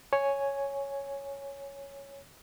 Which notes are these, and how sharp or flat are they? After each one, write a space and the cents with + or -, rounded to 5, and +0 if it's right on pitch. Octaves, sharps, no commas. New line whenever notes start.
C#5 +0 G#5 +0